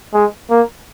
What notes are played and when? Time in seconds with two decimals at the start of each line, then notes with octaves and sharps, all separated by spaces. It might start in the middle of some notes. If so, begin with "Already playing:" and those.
0.14 G#3
0.50 A#3